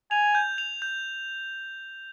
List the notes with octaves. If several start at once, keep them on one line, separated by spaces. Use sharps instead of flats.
G#5 F7
G6
F7
G6